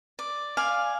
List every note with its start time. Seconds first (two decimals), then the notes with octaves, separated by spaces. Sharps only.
0.19 D5
0.57 D5 F5 G#5